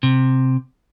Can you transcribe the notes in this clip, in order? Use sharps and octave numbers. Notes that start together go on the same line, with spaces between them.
C3